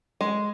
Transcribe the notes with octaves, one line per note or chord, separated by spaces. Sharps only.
G#3